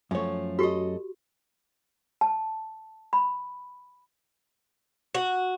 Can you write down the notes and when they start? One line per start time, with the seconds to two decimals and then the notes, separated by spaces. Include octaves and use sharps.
0.11 F#2 F3 A3 C#5
0.59 F#4 G4 A4 D#5
2.21 A5
3.13 B5
5.15 F#4